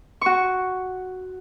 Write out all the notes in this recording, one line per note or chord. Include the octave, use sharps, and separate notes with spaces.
F#4 C#6